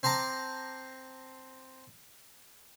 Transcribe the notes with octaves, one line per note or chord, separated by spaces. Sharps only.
C4 C5 A5 A#5 D6